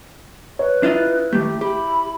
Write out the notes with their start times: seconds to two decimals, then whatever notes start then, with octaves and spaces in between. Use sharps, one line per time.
0.59 B4 C#5
0.83 D4 E4 F4 D#5
1.33 D#3 A3 G4
1.61 G4 B5